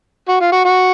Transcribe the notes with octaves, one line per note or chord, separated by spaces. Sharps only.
F#4
F4
F#4
F#4